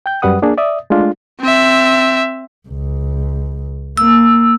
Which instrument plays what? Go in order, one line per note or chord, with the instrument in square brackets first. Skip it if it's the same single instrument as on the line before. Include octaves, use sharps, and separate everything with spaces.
[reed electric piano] G5 G6
F#2 G3 B4 F#5 D#6
A#3 D4 G#4
D5 E5 D#6
G#3 A3 D4 F4
[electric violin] C4 E5
[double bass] C#2
[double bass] A#3 [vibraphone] E6